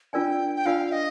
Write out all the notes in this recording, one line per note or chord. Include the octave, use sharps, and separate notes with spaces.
D4 F4 A#4 D5 G5 G#5
G5
D4 F4 A#4 D5 F5 G#5
D#5